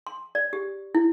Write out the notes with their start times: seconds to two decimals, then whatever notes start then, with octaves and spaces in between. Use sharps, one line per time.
0.07 C6
0.35 D5
0.53 G4
0.95 E4